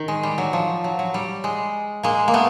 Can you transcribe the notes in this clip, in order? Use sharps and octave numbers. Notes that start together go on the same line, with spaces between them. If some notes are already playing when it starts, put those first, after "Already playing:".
Already playing: D#3
G#3
G3
F#3
F3
F#3
F#3
G3
G#3
G#3 A#3
A#3
A3 B3